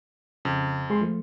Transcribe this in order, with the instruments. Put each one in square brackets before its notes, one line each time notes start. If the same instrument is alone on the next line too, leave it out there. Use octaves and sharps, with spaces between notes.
[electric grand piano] F2 [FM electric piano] C#3
[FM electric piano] G#3 G#4 C6
F3 A3